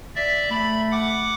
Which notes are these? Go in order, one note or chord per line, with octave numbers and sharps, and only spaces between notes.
D5 E5
A3 B5
F#5 D6